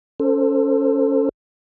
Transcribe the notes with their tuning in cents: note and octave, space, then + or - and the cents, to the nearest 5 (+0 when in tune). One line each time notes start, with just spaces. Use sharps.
C#4 +0 A4 +25 C5 +5